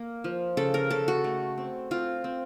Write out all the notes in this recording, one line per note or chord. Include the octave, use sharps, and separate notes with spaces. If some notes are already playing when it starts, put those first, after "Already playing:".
Already playing: A#3
F3
C#3 A4
A#4
C#3 A4
F#4
A3
C4
C4 F4
C4